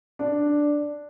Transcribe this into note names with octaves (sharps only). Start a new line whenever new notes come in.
D4